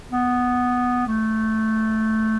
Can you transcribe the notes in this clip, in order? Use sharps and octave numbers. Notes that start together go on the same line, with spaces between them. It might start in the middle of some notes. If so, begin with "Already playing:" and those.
B3
A3